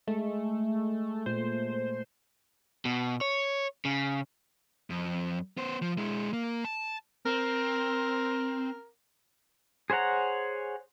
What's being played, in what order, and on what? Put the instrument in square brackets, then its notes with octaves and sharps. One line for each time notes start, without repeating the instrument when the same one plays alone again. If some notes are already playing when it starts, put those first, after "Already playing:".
[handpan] G#3 [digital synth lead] A3
[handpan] A#2 A3 [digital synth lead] C5
[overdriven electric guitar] B2
C#5
C#3
[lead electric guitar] F2
B3 C5
F3
G#3 E4
A#3
A5
[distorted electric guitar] C4 [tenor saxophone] A#4
[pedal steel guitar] G#4 C5 C#5 F#5 A#5